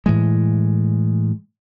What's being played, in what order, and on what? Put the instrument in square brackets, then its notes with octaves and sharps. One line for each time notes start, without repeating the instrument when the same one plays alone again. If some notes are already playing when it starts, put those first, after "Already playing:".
[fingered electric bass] A2 E3 G#3